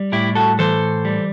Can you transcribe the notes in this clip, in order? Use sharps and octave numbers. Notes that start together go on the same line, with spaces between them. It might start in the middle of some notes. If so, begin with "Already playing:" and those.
Already playing: G3
A2 E4 G4
F#4 A4
E3 A4 C5
G3